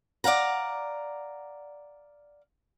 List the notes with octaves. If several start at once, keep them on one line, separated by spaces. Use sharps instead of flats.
D5 F5 F#5 A#5